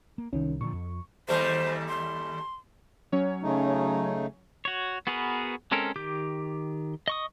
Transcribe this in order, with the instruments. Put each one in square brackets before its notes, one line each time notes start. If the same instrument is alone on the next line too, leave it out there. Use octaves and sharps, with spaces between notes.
[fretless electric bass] A#3
[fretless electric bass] C2 [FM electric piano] D#3 C#4
[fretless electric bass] A#2 D3 F3 [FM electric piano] C#6
[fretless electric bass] F2
[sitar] D#2 G3 A3 [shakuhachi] C5
[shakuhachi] C6
[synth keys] F#3 C#4 C#5
[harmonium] C#3 A3 D#4
[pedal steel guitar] F#4 C#5
B3 F#4 G#4 A#4 B4
G#3 C4 C#4 A4 A#4
D#3 G4 D6 G6
D#5 C#6 D#6